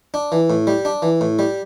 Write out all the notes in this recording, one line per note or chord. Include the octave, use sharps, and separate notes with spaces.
D4
E3
A2
G3
D4
E3
A2
G3